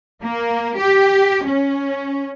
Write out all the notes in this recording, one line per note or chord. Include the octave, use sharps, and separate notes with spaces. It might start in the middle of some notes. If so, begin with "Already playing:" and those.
A#3
G4
C#4